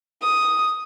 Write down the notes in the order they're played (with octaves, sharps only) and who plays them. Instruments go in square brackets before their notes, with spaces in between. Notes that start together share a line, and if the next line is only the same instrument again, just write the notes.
[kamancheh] D#6